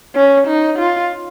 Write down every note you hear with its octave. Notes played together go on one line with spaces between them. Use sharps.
C#4
D#4
F4